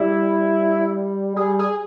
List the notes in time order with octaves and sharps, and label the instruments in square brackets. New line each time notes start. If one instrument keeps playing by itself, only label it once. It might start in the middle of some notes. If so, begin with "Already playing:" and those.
Already playing: [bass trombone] G3 [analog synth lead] E4
[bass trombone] G3 [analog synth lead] G#4
[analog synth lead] G#4